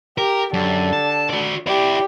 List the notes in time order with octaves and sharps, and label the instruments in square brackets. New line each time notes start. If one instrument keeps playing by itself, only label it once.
[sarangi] G4 [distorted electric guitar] A#4
[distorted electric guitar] F#2 [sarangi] D3
[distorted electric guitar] A5
F#4 D5
[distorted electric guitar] E4 D5 [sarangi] G4